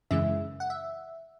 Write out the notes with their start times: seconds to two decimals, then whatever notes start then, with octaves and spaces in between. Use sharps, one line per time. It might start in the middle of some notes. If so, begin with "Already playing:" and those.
0.11 F#2 C#3 E3 G#3 E5
0.60 F#5
0.70 E5